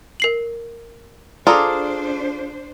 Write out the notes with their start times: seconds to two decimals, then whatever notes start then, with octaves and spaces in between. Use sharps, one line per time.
0.20 A#4 C7 F#7
1.47 D4 F4 G#4 A4 C5 D5 A#5